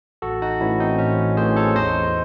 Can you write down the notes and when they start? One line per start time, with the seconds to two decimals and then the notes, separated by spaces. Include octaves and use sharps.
0.22 A1 F#4 A4
0.42 D#4 F#4
0.61 A2 E3 C#4 E4
0.80 C4 D#4
0.99 A1 C#4
1.37 A2 E3 G#4 C5
1.57 A4 C#5
1.75 E2 C5 D#5